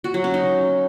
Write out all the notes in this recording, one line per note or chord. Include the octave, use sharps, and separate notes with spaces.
F#4
F#3
C#4
D#4